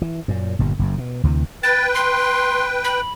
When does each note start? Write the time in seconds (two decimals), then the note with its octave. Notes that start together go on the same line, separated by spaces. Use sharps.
0.02 E3
0.28 F#2 A#2
0.59 G1 A#2 G3
0.79 F#1 F#2
0.98 B2
1.23 D2 C3 E3
1.63 B4 G5 A6
1.94 C6
2.84 B5